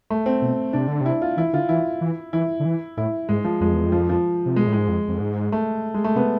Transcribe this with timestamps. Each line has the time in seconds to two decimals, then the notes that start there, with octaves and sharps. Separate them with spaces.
0.10 A3
0.26 C4
0.42 B2
0.73 C3 D4
0.88 D3
1.01 C3 E4
1.22 F4
1.37 E3 E4
1.53 D3 F4
1.69 E3 E4
2.01 E3
2.33 E3 E4
2.60 D3
2.65 E3
2.97 A2 E4
3.29 G#2 G#3
3.44 F3
3.60 F2 G#3
3.73 E2
3.85 F2
3.92 F3
4.09 F3
4.46 C3
4.56 B2 G#3
4.67 A2
4.73 G#2 G#3
4.89 F2
5.08 F2
5.20 G#2
5.52 A3
5.94 G#3
6.04 A3
6.15 C3 B3